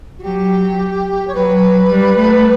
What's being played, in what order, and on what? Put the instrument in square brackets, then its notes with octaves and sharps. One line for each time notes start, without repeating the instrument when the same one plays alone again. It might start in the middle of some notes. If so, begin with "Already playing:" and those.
[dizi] F#4
[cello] F#3 [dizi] G4
[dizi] C#5
[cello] F#3 [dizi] B4
[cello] G3
A3